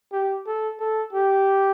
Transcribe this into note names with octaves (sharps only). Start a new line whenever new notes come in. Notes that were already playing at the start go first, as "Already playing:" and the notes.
G4
A4
A4
G4